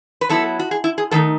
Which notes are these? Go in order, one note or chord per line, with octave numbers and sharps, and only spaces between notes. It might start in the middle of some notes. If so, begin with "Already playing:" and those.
B4
F#3 B3 E4 A4
F#4
G#4
E4
G#4
D#3 A3 D#4 A4